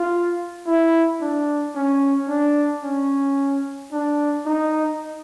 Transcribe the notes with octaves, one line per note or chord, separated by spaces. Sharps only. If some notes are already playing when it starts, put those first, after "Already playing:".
Already playing: F4
E4
D4
C#4
D4
C#4
D4
D#4